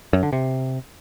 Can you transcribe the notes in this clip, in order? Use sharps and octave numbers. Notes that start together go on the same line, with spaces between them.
F#2
D3
C3